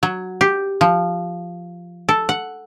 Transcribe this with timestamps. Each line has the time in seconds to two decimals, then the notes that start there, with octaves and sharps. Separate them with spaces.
0.03 F#3
0.41 G4
0.81 F3
2.09 A4
2.29 F#5